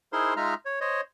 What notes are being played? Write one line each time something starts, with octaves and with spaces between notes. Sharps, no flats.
D#4 E4 G#4 A#4 C5 C6
G#3 D#4 F4 E5 A#5 F6
C#5
C5 C#5 D#5